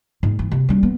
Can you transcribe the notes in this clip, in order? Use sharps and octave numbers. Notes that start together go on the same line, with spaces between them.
G#2
E3
C3
G3 C#4
B3